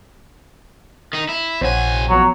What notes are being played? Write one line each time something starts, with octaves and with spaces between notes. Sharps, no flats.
D#3 D#4
E4
A#1 F2 C5 C#5 F#5 G#5
A1 F3 F#3 B3